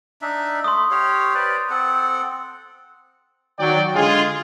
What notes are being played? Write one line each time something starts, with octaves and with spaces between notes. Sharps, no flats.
D4 D#4 E5
A3 C6 D#6
G4 C#5 F5
B4 C5 D5
C4 A4 F#5
D#3 F#3 D5 G5
D3 G#3 F4 G#4